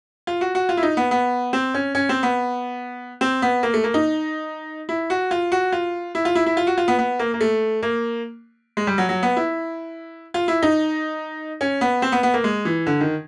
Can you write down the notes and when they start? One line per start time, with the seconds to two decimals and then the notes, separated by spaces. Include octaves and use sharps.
0.27 F4
0.41 F#4
0.55 F#4
0.69 F4
0.77 E4
0.83 D#4
0.97 B3
1.11 B3
1.53 C4
1.74 C#4
1.95 C#4
2.09 C4
2.23 B3
3.21 C4
3.42 B3
3.63 A#3
3.74 A3
3.84 A#3
3.94 D#4
4.89 E4
5.10 F#4
5.31 F4
5.52 F#4
5.72 F4
6.15 E4
6.25 F4
6.35 E4
6.46 E4
6.57 F4
6.67 F#4
6.78 F4
6.88 B3
6.99 B3
7.19 A#3
7.34 A#3
7.41 A3
7.82 A#3
8.77 G#3
8.87 G3
8.98 F#3
9.09 F#3
9.23 B3
9.37 E4
10.34 F4
10.48 E4
10.63 D#4
11.61 C#4
11.81 B3
12.02 C4
12.12 B3
12.23 B3
12.34 A#3
12.44 G#3
12.65 E3
12.86 D3
13.01 D#3